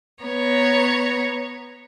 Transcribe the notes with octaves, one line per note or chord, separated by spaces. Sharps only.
B3 C#5 A#5